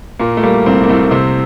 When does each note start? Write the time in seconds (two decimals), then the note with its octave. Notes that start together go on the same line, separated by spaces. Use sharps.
0.19 A#2 A#3
0.37 A3
0.43 G3 A#3
0.66 C2 C4
0.84 A#3
0.89 C2 A3
1.11 C3 C4